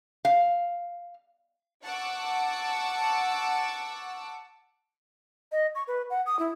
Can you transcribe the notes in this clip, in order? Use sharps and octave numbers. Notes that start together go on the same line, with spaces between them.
F5
F#5 A5 C#6 D6 E6
D#5
C#6
B4
F#5
D#6
E4